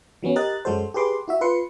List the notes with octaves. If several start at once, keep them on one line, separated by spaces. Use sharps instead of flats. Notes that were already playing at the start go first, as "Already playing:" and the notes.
E3 F#3 B3 C#4
G4 A#4 D#5 F#6 A6
F#2 F#3 G#3 F#4 A4 C5
G4 G#4 B4 C6 D6
E4 F#4 E5
F4 B4 C6 C#7